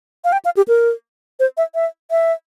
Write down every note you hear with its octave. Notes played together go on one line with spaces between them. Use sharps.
F5
G5
F5
G4
A#4
C5
E5
E5
E5